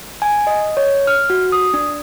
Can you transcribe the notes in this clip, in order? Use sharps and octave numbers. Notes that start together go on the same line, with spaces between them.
G#5
D#5
C#5
F6
F#4
D#6
D4